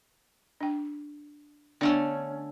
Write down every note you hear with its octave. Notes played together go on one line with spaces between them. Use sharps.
D4 G5
D3 A3 B3 C#4 D4